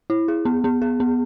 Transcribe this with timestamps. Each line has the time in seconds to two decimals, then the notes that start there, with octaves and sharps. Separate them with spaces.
0.10 E4
0.28 G#4
0.45 B3
0.64 B3
0.82 G#4
1.00 B3